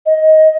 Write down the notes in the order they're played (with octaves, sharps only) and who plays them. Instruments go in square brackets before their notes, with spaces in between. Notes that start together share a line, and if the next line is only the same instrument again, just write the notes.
[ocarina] D#5